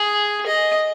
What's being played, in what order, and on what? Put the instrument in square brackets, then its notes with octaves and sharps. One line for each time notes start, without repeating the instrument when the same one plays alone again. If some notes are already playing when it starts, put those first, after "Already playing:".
Already playing: [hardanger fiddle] G#4
D#5